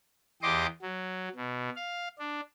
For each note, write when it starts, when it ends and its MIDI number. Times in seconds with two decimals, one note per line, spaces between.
0.42 0.66 40
0.42 0.66 67
0.42 0.66 75
0.42 0.66 84
0.42 0.66 86
0.82 1.28 54
1.36 1.69 47
1.76 2.08 77
2.19 2.40 62